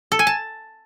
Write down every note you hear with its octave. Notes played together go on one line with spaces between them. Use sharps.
A4
G#5
A5